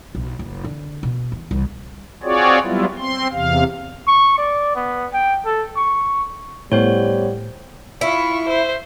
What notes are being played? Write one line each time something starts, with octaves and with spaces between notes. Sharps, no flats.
B1
F#1
D3
B2
E3
C2
C4 F4 F#4 G#4 C#5 D5
F#3 G3 B3 E4 F4
C4 C6
E2 C3 F5
C#6
D5
B3
G5
A4
C#6
A2 G3 B3 C5 C#5
E4 F4 C#6
C5 E5